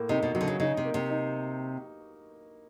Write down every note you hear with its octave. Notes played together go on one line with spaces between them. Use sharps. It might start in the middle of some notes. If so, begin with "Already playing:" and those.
Already playing: A2 A#3
C3 D#4
B2
C3 F#3
D3
C#3
C#3 D#4
C3
A#3
C3
D#4